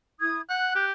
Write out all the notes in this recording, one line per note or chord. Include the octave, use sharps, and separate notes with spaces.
E4 D#6 G#6
F#5 F#6 G6
G4